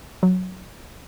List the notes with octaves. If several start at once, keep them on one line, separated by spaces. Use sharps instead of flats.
F#3